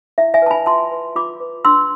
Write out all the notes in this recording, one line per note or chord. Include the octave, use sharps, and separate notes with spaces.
E4 E5
E5 G#5
B4 A5
G#5 B5
F4 A5 C6
B4
F4 B5 D6
B4
D4 C6 E6